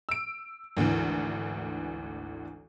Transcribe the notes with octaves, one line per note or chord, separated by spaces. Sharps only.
E6 D7
G#1 D2 D3 E3